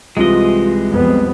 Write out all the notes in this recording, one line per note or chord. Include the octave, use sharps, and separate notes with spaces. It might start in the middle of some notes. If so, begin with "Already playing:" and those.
C2 C3 E3 G#3 F4 D#5
F2 G3 B3